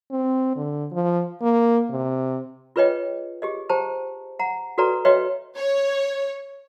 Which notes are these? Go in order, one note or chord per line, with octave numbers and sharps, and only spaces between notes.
C4
D3
F3
A#3
C3
F4 G#4 B4 C#5 D#5 G5
G4 G#4 D#5
G4 C5 G5 A5 A#5
F#5 A#5
F#4 A4 B4 D5 A#5
F#4 B4 C#5 D#5 E5 G5
C#5